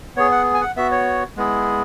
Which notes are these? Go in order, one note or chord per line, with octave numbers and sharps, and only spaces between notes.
B3 G#4 C#5
F#5
G#5
F#5
B3 F#4 E5
C#5
G#3 B3 E4 G#4